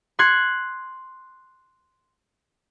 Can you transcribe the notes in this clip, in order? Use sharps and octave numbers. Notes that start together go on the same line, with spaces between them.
C6 F#6 G#6 C#7